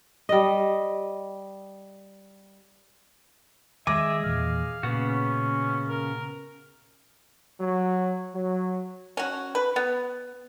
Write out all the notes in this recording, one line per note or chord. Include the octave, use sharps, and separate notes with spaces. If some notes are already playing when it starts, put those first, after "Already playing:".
G3 D#5
D#3 G#3 G#4 D#5 E5 G#5 D6
E2 A#2 E3 F5
A#2 C#3 B3 F#4
C#4
A#4
F#3
F#3
C#4 F#4
B4
B3